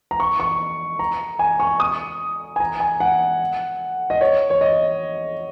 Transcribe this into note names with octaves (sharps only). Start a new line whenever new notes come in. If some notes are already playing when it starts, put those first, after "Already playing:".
A#5
C#6
C#6
A#5
G#5
C#6
D#6
G#5
A#5
G#5
F#5
D#5
C#5
C#5
D#5